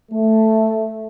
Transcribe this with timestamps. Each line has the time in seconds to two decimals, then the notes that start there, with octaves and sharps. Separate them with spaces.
0.11 A3